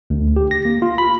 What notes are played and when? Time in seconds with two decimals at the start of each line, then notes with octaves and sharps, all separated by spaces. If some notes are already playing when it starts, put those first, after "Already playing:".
0.10 D2
0.36 G4
0.51 A#6
0.65 A#3
0.82 F4
0.98 B5